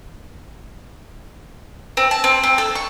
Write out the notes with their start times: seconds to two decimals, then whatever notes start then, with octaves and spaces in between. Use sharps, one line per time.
1.97 C4
2.11 A5
2.24 C4
2.43 C4
2.58 A4
2.75 C#6